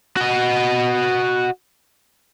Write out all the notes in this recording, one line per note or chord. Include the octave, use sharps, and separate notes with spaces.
F#4 D#5